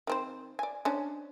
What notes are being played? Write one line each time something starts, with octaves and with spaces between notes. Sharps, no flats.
D#3 C4 C5
D5 G#5
C#4 D4 C5